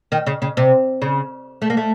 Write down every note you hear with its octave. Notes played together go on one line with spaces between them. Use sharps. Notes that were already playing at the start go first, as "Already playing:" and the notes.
D#3
C#3
C#3
C3
C#3
A3
A#3
A3